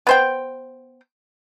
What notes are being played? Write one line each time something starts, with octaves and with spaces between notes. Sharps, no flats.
B3 C5 G5